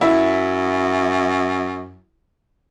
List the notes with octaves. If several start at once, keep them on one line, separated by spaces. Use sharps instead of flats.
F#2 E4